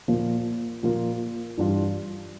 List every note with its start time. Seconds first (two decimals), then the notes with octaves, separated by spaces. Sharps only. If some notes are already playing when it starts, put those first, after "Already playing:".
0.08 A#2 F3 A#3 F4
0.83 A#2 F3 A#3 F4
1.58 G2 E3 G3 D4 F4